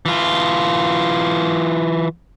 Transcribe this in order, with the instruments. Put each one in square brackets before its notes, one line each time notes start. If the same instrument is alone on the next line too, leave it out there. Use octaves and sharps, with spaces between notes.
[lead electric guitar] E3 F4